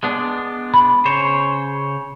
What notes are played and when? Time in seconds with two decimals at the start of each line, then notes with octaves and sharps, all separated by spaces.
0.03 G#3 B3 D4
0.74 B5
1.05 C#3 C5 C#5